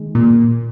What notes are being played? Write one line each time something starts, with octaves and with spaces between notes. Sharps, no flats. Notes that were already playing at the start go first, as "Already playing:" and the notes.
Already playing: D#3 G#3
A#2